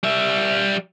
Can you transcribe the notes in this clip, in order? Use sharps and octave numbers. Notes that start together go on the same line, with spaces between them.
G3 E5